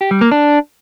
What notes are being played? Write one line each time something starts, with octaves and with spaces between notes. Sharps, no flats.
G4
G3
A#3
D4